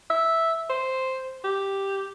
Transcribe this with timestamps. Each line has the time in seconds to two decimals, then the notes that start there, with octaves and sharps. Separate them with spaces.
0.10 E5
0.70 C5
1.44 G4